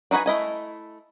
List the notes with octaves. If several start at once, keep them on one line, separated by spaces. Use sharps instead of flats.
D4 D#4 F#4 B4 G#5
A3 E4 D#5 G#5